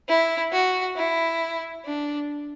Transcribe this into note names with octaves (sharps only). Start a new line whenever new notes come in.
E4
F#4
E4
D4